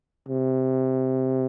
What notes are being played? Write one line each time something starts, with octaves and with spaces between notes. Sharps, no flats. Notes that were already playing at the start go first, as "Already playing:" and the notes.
C3